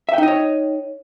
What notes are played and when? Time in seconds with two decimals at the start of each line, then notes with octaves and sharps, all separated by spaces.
0.09 E5
0.13 G5
0.18 D#4
0.23 D#5
0.28 C#5